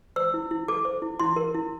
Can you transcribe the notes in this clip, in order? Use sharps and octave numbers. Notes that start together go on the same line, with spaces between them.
C5 E6
E4
E4
A4 D6
C5
E4
E4 C6
A#4
E4